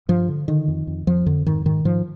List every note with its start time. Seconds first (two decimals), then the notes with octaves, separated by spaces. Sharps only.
0.09 G2 F3
0.28 D3
0.48 D3 D#3
0.68 F2
0.87 F2
1.07 F2 F3
1.26 F2 D3
1.46 G#2 D#3
1.65 G#2 D#3
1.85 G#2 F3